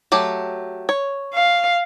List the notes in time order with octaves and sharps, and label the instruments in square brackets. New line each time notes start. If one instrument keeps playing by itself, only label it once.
[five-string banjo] F#3 A3 G4
C#5
[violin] F5